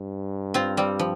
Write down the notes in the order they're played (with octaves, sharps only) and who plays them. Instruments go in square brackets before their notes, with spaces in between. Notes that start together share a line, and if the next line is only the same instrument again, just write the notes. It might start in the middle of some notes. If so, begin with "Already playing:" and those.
Already playing: [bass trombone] G2
[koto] C4 F4
G3 C4
F3